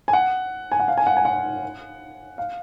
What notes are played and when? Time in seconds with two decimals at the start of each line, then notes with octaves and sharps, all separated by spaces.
0.08 G#5
0.13 F#5
0.72 G#5
0.80 F#5
0.88 F5
0.97 G#5
1.07 F#5
1.17 G#5
1.25 F#5
2.38 F5